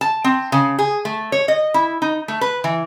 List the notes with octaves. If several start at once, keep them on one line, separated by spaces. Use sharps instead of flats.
A5
C4
C#3
G#4
A3
C#5
D#5
E4
D#4
A3
B4
E3